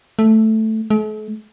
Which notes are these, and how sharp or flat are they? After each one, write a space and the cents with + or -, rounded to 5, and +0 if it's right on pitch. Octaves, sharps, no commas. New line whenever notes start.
A3 +0
A3 -45